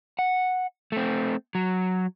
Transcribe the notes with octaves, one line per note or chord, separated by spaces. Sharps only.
F#5
A3 C4
F#3